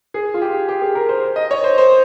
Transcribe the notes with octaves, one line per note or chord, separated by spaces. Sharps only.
G#4
F4
G4
G4
G#4
A#4
C5
D#5
C#5
C5
C5